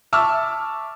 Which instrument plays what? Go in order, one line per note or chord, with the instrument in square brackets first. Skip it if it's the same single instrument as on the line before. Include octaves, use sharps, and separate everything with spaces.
[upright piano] E5 A5 C#6 D6 E6 F6